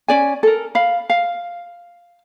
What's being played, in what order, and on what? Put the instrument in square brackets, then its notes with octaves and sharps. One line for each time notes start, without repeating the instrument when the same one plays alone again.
[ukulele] C#4 D5 G#5
A4 A#4
F5 B5
F5